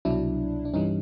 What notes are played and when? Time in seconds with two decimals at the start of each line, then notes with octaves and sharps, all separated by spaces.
0.05 C2 B2 F#3 D4 E4
0.65 D4
0.73 G2 E3 G3 C#4 D#4